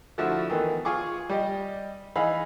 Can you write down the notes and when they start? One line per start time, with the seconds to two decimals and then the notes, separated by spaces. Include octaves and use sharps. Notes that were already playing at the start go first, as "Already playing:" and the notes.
0.18 D3 F3 A3 E4 F#4
0.49 D#3 E3 A3 B3
0.85 F4 G#4 C#6 D6
1.29 G3 G4 D#5
2.16 E3 D#4 G#4 F5 B5